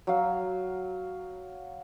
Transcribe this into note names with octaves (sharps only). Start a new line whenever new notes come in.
F#3 F5